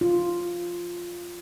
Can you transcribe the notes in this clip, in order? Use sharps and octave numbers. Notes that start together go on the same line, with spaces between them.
F4